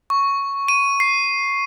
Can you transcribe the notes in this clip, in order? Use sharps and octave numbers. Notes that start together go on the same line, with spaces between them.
C#6
D#7
C7